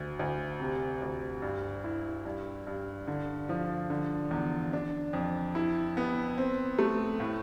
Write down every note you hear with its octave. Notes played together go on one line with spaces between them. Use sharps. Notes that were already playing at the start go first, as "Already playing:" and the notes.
Already playing: D2
D2
C3
D2
G2
E4
G2
G2
D3
F3
D3
E2
D4
F2
E4
B3
C4
A3
A2